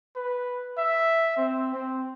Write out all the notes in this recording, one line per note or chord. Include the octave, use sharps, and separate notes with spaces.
B4
E5
C4
C4